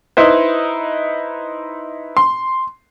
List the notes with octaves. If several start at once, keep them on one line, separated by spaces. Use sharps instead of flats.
D#4 E4 B4 C5
C6